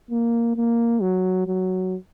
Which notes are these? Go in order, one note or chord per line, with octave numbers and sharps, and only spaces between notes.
A#3
A#3
F#3
F#3